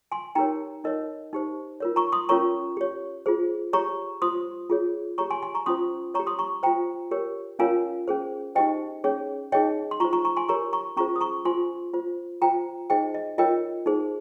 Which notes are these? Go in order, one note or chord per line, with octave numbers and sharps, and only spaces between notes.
G#5 C6
D#4 G4 A#4 C#5 G5 A#5
D#4 A#4 C#5 D#5
D#4 G4 C5
F4 A#4 C#5
A#5 C#6
C6 D#6
C#4 F4 A#4 C#5 A#5 C#6
G4 C#5
F4 G#4 C5
G4 C#5 A#5 C#6
F4 C5 C6 D#6
F4 G#4 C#5
G4 C#5 A#5 C#6
G#5 C6
G#5 C6
A#5 C#6
C#4 F4 C5 C6 D#6
C#5 A#5 C#6
G4
C6 D#6
A#5 C#6
F4 C5 G5 A#5
G4 A#4 C#5
C#4 F4 A#4 C#5 F5 G#5
C#4 G#4 C5
D#4 G4 C5 D#5 G5
C#4 G#4 C#5
D#4 G#4 C#5 D#5 G5
C6
F4 C5 A#5 C#6
A#5 C#6
A#5 C#6
G#5 C6
G4 A#4 C#5 A#5 C#6
A#5 C#6
C#4 F4 G#4 C5 A#5 C#6
D#6
A#5 C#6
F4 C5 G#5 C6
F4 C5
F4 C5 G5 A#5
D#4 G#4 C5 D#5 G5
D#5
F4 A#4 C#5 D#5 G5
D#4 G#4 C5